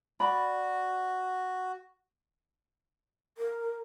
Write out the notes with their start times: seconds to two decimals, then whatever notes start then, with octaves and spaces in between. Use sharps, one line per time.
0.20 F#4 D5 B5
3.38 A#4